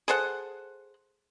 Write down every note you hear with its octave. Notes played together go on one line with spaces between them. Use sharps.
G#4 A4 C5 F#5